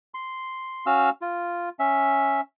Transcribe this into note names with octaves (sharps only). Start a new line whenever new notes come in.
C6
C#4 F#4 F5 E6 F6
F4
C#4 E5